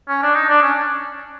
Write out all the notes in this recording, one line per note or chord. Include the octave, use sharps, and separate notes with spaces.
C#4
D4
D#4
D4
C#4